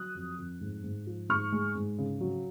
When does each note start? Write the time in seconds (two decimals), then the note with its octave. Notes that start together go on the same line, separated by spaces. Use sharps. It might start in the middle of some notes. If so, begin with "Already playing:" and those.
Already playing: F#3 D#6 F#6
0.15 F2
0.38 F2
0.61 G#2
0.84 G#2
1.07 F3
1.29 G#2 C#6 F6
1.52 G#3
1.75 G#2
1.98 C#3
2.21 F#3